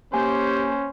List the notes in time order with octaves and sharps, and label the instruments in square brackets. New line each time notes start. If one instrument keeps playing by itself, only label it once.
[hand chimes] A#3 G#5 [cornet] C#4 [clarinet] G4 [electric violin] C5